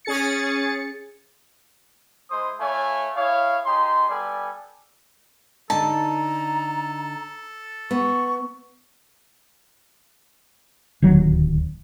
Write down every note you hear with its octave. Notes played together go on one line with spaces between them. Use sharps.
C#4 G#4 A6 C#7
G#3 E4 C5 C6 D#6
A3 E4 C#5 F5 G#5
E4 G#4 C#5 F5
D#4 G4 G#4 C6
G3 B3 A4 D5 G#5
D3 D#4 A4 A5 A#5
B3 C#6
D1 D#2 F#3